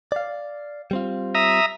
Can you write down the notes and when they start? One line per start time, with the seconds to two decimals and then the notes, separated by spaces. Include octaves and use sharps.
0.12 D5 F5
0.91 G3 C4 F4
1.35 E5 A#5 D#6